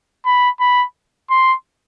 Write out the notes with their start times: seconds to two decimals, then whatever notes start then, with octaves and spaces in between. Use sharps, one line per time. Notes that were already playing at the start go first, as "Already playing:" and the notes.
0.25 B5
0.60 B5
1.30 C6